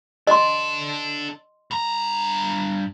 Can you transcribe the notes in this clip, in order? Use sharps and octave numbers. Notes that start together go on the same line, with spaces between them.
D4 A4 D#5 C6
G2 A#5